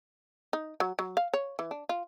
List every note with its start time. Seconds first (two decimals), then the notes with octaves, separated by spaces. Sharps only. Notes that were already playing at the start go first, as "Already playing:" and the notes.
0.53 D#4
0.80 F#3
0.99 F#3
1.17 F5
1.34 C#5
1.59 E3
1.71 D4
1.89 F4